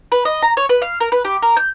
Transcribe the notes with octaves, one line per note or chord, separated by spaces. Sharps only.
B4
D#5
A#5
C#5
B4
F5
A#4
B4
G4
A#4
G6